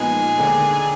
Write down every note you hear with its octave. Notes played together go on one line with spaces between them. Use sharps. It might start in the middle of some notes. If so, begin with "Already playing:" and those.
Already playing: A#2 F3 G#3 B3 D#4 G#4
D#2 D3 G#3 D4